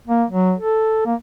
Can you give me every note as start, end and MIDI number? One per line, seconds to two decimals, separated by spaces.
0.08 0.24 58
0.30 0.53 54
0.59 1.01 69
1.06 1.15 58